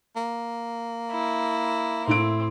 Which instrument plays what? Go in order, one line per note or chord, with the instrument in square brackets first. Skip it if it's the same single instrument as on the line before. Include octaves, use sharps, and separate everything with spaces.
[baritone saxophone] A#3
[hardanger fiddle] E4
[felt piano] A2 E4 D7 [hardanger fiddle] C4